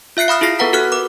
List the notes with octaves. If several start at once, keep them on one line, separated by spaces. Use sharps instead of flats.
F4 E5 F#6 C7 C#7
F5 B5 D#6 F6
E4 F4 G#4 A#6 C7
B3 A4 B4 F#5 A#5 B6
F#4 A4 B4 F6 F#6
A#4 D6